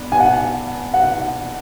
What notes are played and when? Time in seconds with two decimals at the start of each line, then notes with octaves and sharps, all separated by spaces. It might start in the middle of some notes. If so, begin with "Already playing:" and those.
Already playing: B3 D4
0.12 G#5
0.20 F#5
0.94 F#5